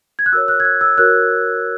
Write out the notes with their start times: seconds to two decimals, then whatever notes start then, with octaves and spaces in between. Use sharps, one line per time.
0.19 G#6
0.26 F#6
0.32 F#4 A#4 C#5 E6
0.48 F#6
0.60 G#6
0.65 F#6
0.81 E6
0.98 F#4 A#4 C#5 F#6